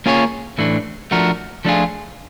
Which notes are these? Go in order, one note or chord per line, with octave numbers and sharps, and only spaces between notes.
A#3 C#4 F4 G#4 C#5
A2 E3 A3 D4
F3 A3 D4 F#4 A#4
F3 A3 D4 F4 G#4